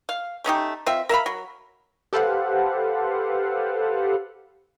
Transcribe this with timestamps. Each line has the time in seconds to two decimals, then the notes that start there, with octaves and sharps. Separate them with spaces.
0.09 F5
0.44 A3 C#4 D#4 G4
0.86 C4 F4 E5
1.09 A#4 E5 F5 B5
1.26 F#3
2.13 G4 A4 B4 C5 F5 F#5